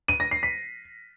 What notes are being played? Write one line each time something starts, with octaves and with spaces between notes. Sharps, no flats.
D#7
A#6
C7
B6